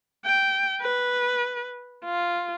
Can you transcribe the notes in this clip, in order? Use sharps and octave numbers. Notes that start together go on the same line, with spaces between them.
G5
B4
F4